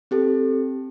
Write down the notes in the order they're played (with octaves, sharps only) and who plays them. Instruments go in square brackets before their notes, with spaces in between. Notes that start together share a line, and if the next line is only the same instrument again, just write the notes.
[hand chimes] C4 G4 A4